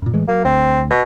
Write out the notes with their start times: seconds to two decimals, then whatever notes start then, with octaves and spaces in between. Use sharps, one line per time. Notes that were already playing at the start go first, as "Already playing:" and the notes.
0.02 F#2 A#2
0.14 A2 E3 G#3
0.28 F#3 A#3
0.45 D2 C4
0.90 B2